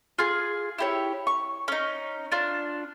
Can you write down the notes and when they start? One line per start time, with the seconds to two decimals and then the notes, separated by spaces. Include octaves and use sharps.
0.19 F4 G#4
0.78 E4 G4 C#5
1.27 C#6
1.68 C#4 D#4
2.32 D4 F4